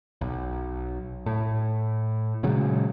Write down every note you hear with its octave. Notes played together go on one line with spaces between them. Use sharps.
B1
A2
A#2 C#3 F#3 G#3